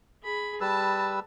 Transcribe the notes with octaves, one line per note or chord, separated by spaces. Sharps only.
G#4 B5
G3 B4 A5 E6